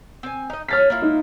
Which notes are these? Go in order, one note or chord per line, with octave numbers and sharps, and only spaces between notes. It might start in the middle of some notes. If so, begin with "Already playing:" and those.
C4 G#5
D#4 D#5
C#4 A4 C#5 F6 A6 B6
A#3 E4 F4
D#4